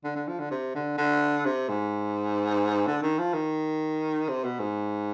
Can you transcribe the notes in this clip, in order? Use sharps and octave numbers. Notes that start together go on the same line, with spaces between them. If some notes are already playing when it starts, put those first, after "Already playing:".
D3
D3
F3
D3
C3
D3
D3
C3
G#2
D3
D#3
F3
D#3
C3
B2
G#2